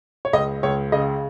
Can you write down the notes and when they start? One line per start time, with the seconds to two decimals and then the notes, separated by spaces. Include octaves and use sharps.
0.25 C#5
0.33 C#2 D#5
0.63 C#2 C#5
0.92 C#3 D#5